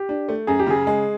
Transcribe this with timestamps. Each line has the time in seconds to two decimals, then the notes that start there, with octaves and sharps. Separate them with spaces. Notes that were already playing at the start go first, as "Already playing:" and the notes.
Already playing: G4
0.09 D4
0.28 A3
0.47 F#2 G#4
0.59 G4
0.67 C#3 G#4
0.87 G#3